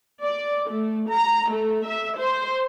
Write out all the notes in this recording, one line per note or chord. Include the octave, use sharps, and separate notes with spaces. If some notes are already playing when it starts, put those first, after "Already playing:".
D5
A3
A#5
A3
E5
C5